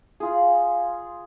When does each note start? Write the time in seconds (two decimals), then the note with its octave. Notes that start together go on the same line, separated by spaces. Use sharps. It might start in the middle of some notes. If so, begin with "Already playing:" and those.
0.20 F4 G#4